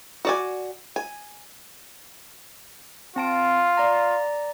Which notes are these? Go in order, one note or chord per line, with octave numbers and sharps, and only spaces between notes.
F#4 D5 G#5
G#5
C4 F4 A5 D7
D5 A#5